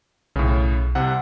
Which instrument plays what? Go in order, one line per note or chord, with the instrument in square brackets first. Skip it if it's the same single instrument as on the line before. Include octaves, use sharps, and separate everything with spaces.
[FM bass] B1 [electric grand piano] A2 C#3
[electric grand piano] C2 C3 F#5